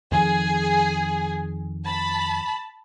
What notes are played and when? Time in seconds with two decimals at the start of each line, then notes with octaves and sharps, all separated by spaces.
0.12 F2 D#3 F3 G#4
1.85 A5 B5